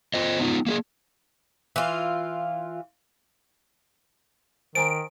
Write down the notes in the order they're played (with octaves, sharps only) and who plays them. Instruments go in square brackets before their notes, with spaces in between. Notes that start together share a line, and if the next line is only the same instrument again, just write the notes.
[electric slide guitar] F4 C5 D#5
B3 D#4 F4
A#3 G4 G#4
[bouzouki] E3 F4
[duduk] D#3 [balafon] C5 G#5 A#5 [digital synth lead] D7